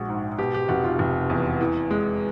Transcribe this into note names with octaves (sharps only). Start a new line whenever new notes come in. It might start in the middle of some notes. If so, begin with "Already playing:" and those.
Already playing: A#1 G#3 F#4
G#2
B2 G4
G4
F1 F#4
F4
F1
E2
E3
G#3